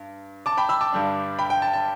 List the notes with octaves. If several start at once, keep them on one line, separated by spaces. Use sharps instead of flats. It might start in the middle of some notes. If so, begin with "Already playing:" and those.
Already playing: G2
A5 D6
G5 B5
B5 E6
A5 D6
G2 D3 G3 D4
G5 B5
G5
A5
A5